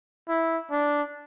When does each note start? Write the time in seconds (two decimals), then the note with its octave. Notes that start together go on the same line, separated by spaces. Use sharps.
0.29 E4
0.71 D4